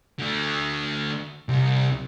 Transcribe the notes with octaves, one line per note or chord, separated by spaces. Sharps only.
D3 A3
C2